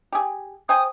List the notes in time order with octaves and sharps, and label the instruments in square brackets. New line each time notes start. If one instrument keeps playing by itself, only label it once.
[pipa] G4 G#4
[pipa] C5 G5 G#5 [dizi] D#6